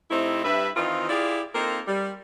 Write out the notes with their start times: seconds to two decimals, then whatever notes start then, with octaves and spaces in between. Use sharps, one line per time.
0.11 C3 A3 C4 D#4 E4
0.44 G2 B4 E5
0.76 D#3 E3 C4 D#4 F4
1.09 E4 F4 G4 G#4 D5
1.54 A#3 C4 D#4 F4 A4 A#4
1.87 G3